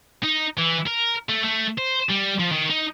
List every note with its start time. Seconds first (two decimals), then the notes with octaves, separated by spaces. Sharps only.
0.23 D#4
0.58 E3
0.87 A#4
1.29 A3
1.44 A3
1.78 C5
2.09 G3
2.39 F3
2.52 D#3
2.69 D#4